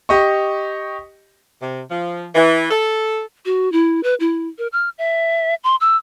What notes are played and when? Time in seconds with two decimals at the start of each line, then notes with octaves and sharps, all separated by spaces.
0.09 G4 D#5 C#6
1.61 C3
1.90 F3
2.35 E3
2.71 A4
3.45 F#4
3.72 E4
4.03 B4
4.20 E4
4.58 A#4
4.73 F6
4.98 E5
5.64 C6
5.81 E6